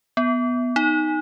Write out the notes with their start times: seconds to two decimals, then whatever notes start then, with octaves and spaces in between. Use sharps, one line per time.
0.17 B3
0.76 D#4